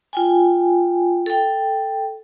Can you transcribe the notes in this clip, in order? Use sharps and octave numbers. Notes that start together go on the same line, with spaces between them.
F4 G5 G#5
A4 G5